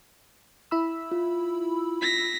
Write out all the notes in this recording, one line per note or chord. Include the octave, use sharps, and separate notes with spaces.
E4 B5 E6
F4
A#6 B6